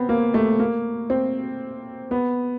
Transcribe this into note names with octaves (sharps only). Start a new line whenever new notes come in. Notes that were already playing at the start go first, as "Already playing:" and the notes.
Already playing: B3 C4
A#3
A3
A#3
C4
B3